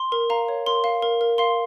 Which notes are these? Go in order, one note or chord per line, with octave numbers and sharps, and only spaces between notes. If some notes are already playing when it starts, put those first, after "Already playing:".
Already playing: C6
A#4
F5 A#5
C#5
A#4 C6
F5
A#4
A#4
F5 C6